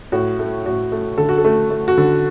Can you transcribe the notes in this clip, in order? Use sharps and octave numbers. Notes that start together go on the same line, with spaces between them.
A2 F#4
A3
A2 F#4
A3
D3 A4
F#4
A4
A3
A3
F#4
D3